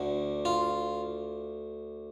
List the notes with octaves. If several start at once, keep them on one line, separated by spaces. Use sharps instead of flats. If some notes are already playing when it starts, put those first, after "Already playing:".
Already playing: D2 D3
F4